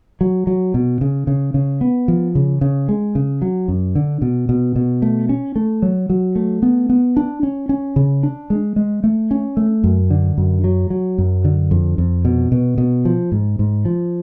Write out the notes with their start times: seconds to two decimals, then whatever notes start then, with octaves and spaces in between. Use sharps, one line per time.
0.21 F#3
0.47 F#3
0.74 B2
1.01 C#3
1.27 C#3
1.54 C#3
1.81 B3
2.08 F3
2.35 C#3
2.61 C#3
2.89 G#3
3.15 C#3
3.42 F#3
3.68 F#2
3.95 D3
4.22 B2
4.49 B2
4.76 B2
5.02 A3
5.29 C#4
5.56 A3
5.82 F#3
6.10 F#3
6.36 A3
6.63 B3
6.89 B3
7.17 D4
7.43 C#4
7.69 C#4
7.96 C#3
8.23 D4
8.50 G#3
8.76 G#3
9.04 A3
9.31 C#4
9.57 A3
9.84 F#2
10.10 D3
10.38 F#2
10.64 F#3
10.90 F#3
11.18 F#2
11.44 D3
11.71 F2
11.98 F2
12.25 B2
12.52 B2
12.78 B2
13.05 F3
13.32 G#2
13.59 G#2
13.85 F3